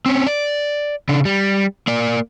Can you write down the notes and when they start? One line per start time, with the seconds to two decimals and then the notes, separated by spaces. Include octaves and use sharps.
0.06 C4 C#4
0.27 D5
1.09 C#3 D4
1.25 G3
1.87 A#3 D5